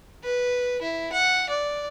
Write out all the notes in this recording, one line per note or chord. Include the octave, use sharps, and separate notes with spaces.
B4
E4
F#5
D5